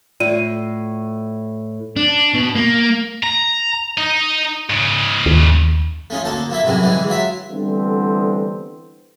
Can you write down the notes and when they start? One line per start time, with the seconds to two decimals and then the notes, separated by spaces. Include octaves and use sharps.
0.20 A2 F4 D5 D#7
1.97 D4
2.34 B2
2.55 A#3
3.23 A#5
3.98 D#4
4.70 G#2 C#3
5.26 D#2
6.10 A3 C#4 D#4 F4
6.25 D2 A#3 A4 A5
6.50 F3 A#3 E4 E5
6.64 F#2 A2 C3 E3 G3 G#3
6.83 D3 E3 G3 G#3
7.08 F#3 F4 E5
7.50 D3 E3 G3 A3 B3 C4